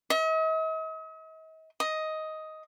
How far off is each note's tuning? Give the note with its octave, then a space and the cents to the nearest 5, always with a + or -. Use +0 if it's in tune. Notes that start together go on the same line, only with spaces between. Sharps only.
D#5 +45
D#5 +10